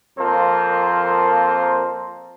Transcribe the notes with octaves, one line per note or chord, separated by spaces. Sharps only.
F2 F3 A#3 C4 A#4 C5